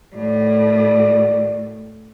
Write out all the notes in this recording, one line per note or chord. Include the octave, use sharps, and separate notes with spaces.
A2 D#3 F#4 D5